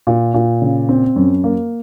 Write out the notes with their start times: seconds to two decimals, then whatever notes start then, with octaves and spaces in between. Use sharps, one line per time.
0.07 A#2
0.34 A#2
0.62 C#3
0.89 C4
1.16 F#2
1.44 A#3